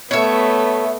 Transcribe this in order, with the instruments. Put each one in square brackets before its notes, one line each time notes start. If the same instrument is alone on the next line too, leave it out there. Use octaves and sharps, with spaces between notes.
[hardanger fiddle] A3 B3 [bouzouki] C#5 E5